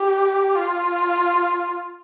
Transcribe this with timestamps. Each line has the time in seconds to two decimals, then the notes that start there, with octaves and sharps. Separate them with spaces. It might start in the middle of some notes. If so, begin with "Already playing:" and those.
Already playing: G4
0.56 F4